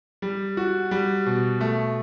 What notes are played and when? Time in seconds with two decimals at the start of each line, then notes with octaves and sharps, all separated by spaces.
0.22 G3
0.57 F#4
0.91 G3
1.26 B2
1.61 A3